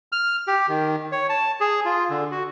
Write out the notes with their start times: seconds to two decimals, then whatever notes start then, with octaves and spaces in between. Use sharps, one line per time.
0.12 F6
0.47 G4
0.68 D#3
1.12 C#5
1.29 A5
1.61 G#4
1.85 F4
2.10 D3
2.31 F#4